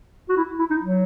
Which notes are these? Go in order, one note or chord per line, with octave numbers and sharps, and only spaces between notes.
F#4
E4
E4
D#4
F#3